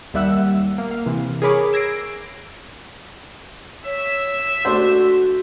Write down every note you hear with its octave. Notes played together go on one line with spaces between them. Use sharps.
D#2 G3 E5 F#5 E6
A#3
F5
C3 E3
G#4 A#4 C#5 B5 D6
E6 G#6 A#6 C7 D7
C#5 E5
A3 D4 F#4 C5